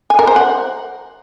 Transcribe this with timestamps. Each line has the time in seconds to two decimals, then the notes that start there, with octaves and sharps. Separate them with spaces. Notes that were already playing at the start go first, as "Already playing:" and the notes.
0.10 G#5
0.19 A#4
0.27 C5
0.36 F#5